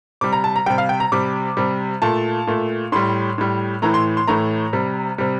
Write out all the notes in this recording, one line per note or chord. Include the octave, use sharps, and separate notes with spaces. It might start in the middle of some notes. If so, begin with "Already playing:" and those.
C3 G3 D6
A#5
A5
A#5
C3 G3 G5
F5
G5
A#5
C3 G3 D6
C3 G3
A#2 A3 A5
A#2 A3
A2 G3 C6
A2 G3
A2 E3 A3 A#5
C6
C6
A2 E3 A3 A#5
C3 G3
C3 G3